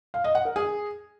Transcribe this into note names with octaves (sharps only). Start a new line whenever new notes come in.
F5
D#5
F#5
A#4
G#4